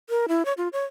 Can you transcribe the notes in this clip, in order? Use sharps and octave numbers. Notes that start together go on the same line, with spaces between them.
A#4
E4
C#5
F4
C#5